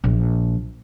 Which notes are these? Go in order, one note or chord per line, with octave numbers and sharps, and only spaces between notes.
A#1